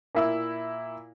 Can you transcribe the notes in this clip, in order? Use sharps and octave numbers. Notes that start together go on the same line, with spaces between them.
A#2 E4 E6